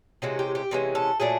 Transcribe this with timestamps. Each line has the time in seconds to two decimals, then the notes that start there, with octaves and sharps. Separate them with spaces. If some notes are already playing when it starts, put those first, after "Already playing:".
0.22 C3 E3 G#3 C#4 F#4
0.39 G4
0.55 G4
0.71 C3 E3 G#3 C#4
0.95 A4
1.20 A#2 F#3 A3 D4 G#4